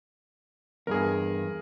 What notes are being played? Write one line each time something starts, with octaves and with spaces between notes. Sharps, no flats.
E2 G2 G#4 A#4